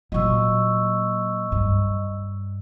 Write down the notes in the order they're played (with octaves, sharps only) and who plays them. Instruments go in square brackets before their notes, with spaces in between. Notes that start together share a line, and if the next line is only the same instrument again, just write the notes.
[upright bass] A#2 F#3 [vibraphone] D#5 C#6 E6
[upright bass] G2